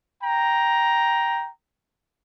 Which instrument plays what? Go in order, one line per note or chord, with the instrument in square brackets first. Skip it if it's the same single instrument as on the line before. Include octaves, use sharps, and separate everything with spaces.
[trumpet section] G5 A#5